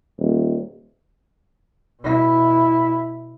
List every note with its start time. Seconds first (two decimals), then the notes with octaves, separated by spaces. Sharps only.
0.19 D#1
2.01 B2 E4